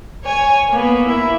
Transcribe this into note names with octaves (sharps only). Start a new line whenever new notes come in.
C#5 G#5
A#3 B3
E4